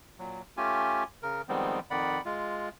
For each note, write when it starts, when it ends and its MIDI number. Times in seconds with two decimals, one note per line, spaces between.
0.19 0.42 46
0.19 0.42 54
0.57 1.04 57
0.57 1.04 61
0.57 1.04 65
0.57 1.04 67
0.57 1.04 80
1.23 1.42 49
1.23 1.42 70
1.49 1.80 51
1.49 1.80 53
1.49 1.80 55
1.49 1.80 56
1.49 1.80 59
1.49 1.80 60
1.91 2.21 41
1.91 2.21 51
1.91 2.21 74
1.91 2.21 78
1.91 2.21 83
2.25 2.69 56
2.25 2.69 65